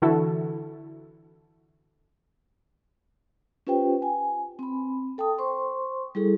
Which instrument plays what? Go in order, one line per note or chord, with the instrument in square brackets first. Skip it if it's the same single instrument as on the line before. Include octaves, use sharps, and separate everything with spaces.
[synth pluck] D3 E3 E4 F#4 A4
[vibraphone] C#4 F4 G4 B4 C5 G5
G#5
C4 B5
A4 G5 A5 D#6
C5 C6 C#6
G3 E4 G#4 A4